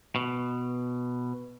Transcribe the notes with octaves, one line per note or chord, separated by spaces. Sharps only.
B2